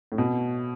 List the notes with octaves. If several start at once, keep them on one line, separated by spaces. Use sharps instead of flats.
A2
B2